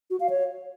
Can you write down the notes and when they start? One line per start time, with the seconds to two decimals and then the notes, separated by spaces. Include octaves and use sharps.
0.10 F#4
0.20 F5
0.30 C#5